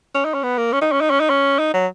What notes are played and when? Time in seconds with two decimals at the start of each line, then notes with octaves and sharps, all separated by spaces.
0.15 C#4
0.25 D#4
0.34 C#4
0.43 B3
0.58 A#3
0.72 C#4
0.81 D#4
0.92 C#4
1.01 D#4
1.10 C#4
1.20 D#4
1.30 C#4
1.59 D#4
1.74 F#3